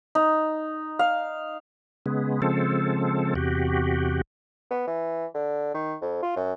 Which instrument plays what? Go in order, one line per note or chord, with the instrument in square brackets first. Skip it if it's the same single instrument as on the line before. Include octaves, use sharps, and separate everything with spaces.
[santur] D#4
F5
[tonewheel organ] C#3 G#3 B3
C#3 F3 G#3 C4 A4
E2 C3 F#4 G4
[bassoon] B3
E3
D3
D#3
F2
F4
F#2